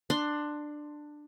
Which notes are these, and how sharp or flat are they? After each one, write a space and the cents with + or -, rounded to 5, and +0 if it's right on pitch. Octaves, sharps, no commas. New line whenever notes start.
D4 +15 C6 +0